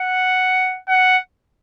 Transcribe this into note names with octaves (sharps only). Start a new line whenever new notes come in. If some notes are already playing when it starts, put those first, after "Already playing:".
Already playing: F#5
F#5